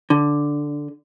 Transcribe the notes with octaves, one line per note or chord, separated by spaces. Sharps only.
D3